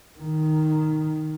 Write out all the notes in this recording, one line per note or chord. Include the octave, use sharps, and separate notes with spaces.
D#3